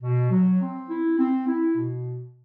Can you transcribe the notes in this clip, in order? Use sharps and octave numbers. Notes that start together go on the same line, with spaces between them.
B2
F#3
C4
E4
C4
E4
B2